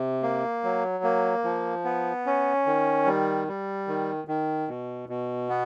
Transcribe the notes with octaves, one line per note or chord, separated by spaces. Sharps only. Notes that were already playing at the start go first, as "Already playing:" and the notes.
Already playing: C3
A#3
F#3
A#3
F3
B3
C#4
D#3
G3
G3
D#3
D#3
B2
B2
B3